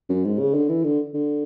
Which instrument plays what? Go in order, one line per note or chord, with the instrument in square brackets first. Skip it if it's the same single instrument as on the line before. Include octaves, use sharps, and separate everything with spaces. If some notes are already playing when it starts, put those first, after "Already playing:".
[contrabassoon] F#2
G#2
C#3
D3
E3
D3
D3